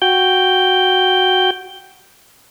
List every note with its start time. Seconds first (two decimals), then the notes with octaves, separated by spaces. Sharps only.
0.02 F#4 G5 G6